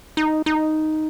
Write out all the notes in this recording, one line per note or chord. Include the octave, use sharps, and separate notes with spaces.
D#4
D#4